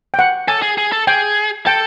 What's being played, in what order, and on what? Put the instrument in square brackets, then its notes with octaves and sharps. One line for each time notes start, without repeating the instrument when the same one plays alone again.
[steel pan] G5
F#5
[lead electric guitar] A4 [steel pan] G#5
[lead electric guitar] G#4
G#4
A4
[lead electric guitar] G#4 [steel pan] G5
[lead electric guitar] A4 [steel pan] G5